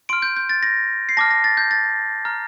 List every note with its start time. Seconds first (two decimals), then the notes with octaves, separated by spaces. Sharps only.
0.09 C6 F6 D7
0.22 G6
0.36 G6
0.49 A6
0.63 A#6
1.09 C7
1.17 A5 D6 F6 A#6
1.31 A#6
1.44 A6
1.57 G6
1.71 A6
2.25 A#5 F6